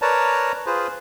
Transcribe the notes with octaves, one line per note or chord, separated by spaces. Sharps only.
A#4 B4 C#5 D5 A5 A#5
F4 G#4 B4 C5